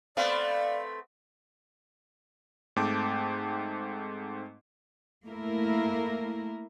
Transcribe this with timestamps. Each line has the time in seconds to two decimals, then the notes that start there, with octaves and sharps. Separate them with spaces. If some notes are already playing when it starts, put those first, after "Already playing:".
0.17 A3 B3 C4 D5 F5
2.76 G#2 A3 C4 G5 A5 D6
5.26 A3 A#3 E4 A#4